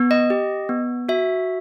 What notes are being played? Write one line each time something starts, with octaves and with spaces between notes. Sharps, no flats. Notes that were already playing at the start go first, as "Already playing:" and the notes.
Already playing: B3
D#5
G4
B3
F#4 E5